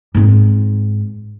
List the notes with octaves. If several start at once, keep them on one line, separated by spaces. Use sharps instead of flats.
G#2 C4